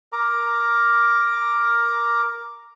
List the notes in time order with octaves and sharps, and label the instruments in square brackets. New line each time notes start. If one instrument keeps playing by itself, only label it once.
[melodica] A#4 A#5 D6